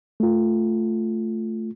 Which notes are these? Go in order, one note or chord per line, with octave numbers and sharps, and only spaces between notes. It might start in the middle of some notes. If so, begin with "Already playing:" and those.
A3 F4